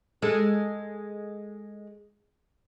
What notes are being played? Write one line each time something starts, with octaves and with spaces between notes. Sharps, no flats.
G#3 A4